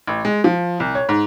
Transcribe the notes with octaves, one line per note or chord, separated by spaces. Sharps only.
A1
G#3
F3
C2
C#5
G#2